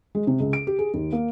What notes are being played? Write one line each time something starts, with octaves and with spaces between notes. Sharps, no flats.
G#3
C3
C#2
D7
G4
G#4
D#2
A#3